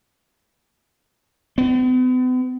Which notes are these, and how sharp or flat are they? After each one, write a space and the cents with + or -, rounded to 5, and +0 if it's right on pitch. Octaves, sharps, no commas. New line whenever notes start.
B3 +45